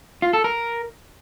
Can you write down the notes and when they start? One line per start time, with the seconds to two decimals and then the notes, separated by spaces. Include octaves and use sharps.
0.22 F4
0.33 A4
0.44 A#4